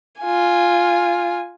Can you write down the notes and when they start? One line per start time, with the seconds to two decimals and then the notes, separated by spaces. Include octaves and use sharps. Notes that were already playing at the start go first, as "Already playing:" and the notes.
0.20 F4 G#5